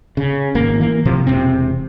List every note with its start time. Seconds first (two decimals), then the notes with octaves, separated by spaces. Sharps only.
0.17 C#3
0.55 G#1 A#3
0.80 E3 A#3
1.05 A2 C3 F3
1.27 E1 C2 C3 C4